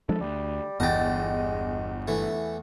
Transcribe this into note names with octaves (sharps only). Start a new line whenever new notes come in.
F3 G#3 D4 A4
D2 G3
G1 E2 G#3 D#5 G5 A6
E3 A3